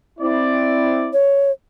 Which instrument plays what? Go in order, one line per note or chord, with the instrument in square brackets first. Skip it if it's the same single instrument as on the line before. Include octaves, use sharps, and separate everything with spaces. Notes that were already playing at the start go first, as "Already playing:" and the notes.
[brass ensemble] C4 E4 D5
[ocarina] C#5